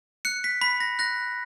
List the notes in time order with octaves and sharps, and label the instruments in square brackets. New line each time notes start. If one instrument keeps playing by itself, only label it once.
[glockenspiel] F#6 C#7
B6
B5 B6
A#6
F#6 A#6